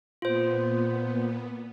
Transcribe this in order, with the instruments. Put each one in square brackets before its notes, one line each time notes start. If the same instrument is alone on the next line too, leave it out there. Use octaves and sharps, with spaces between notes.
[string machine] A#2 B3 [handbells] F4 C5